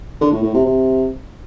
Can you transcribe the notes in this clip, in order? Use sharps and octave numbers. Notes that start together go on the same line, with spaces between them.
D3
A2
A2
C3
C3